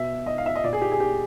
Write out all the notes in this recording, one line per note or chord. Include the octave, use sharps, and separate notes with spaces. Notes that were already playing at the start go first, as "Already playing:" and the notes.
Already playing: B2 E5
D#5
F5
E5
D#5
A#2 D5
G#4
G4
G#4
G4